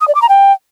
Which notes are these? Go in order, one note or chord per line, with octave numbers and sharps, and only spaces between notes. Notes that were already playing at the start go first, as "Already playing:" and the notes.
D#6
D5
D6
A#5
G5